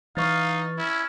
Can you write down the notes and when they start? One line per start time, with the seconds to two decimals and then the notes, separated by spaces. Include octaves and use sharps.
0.17 E3 D#4 F5 C#6 F6 A6
0.78 C#4 E4